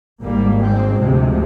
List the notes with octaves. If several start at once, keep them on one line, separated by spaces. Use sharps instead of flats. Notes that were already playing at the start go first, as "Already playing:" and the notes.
G#1 G#2 G3 A#3
G#3 C4
D2 C3 F3 G#3